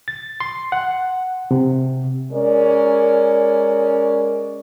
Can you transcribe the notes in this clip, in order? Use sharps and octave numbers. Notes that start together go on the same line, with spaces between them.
A6
C6
F#5
C3
G#3 C#4 A#4 D5